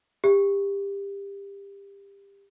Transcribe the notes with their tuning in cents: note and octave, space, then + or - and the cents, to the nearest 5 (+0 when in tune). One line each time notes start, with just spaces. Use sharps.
G4 +25